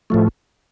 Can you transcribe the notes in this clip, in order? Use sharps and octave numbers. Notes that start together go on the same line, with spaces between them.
A2 F3 A3